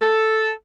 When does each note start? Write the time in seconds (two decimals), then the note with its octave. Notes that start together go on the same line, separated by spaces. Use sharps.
0.02 A4